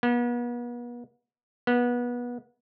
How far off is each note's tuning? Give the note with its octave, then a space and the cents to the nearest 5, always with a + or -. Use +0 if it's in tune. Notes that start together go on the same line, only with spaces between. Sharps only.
B3 -40
B3 -25